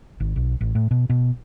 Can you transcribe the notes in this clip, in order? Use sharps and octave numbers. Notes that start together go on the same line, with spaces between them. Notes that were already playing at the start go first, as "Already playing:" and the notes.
G#1
B1
A1
A2
B2
B2